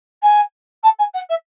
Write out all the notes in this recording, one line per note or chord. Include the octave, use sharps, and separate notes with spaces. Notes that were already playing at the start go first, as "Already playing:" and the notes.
G#5
A5
G#5
F#5
E5